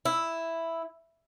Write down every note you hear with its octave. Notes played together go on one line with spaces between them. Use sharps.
E4